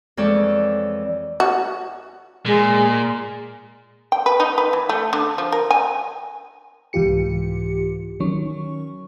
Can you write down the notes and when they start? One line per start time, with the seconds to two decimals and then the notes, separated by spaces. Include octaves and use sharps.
0.17 F2 E3 G#3 A4 C#5 D5
1.40 F#4
2.46 A#2 G#3
4.12 G5
4.26 B4
4.40 D#4
4.58 B4
4.73 E3
4.89 A3
5.13 D3
5.38 F3
5.52 A#4
5.70 G#5
6.93 C2 G#2 E3 F4 G4 C#7
8.20 D#3 F#3 C#4 C#6